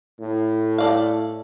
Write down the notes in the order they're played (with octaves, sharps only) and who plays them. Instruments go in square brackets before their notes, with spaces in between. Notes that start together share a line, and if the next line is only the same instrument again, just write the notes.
[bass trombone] A2
[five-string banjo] A4 D5 F5